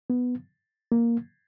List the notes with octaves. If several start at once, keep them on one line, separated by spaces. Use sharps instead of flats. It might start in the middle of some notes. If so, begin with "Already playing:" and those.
B3
A#3